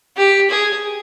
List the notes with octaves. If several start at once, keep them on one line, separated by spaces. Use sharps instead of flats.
G4
G#4